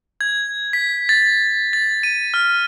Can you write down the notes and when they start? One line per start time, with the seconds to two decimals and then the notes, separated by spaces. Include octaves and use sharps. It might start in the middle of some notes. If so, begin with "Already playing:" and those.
0.21 G#6
0.73 B6
1.09 A6
1.73 A6
2.03 D#7
2.34 F6